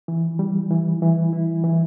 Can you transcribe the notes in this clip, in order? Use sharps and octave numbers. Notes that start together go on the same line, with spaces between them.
E3
G3
E3
E3
E4
E3